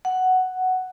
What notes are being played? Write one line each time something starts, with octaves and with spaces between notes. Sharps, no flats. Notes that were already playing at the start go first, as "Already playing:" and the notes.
F#5